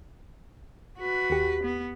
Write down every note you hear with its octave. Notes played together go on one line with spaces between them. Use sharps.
F#4 B4
D#2 G4
B3